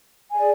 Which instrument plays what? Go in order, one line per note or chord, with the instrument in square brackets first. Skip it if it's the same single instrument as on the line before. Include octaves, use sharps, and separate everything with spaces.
[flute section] G#4 D5 G#5